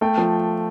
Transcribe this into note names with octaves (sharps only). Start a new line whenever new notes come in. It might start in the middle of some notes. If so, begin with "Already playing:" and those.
A3 G5
F3